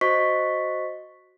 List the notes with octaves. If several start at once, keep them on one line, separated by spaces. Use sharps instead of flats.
F#4 C5 D#5 C#6 B6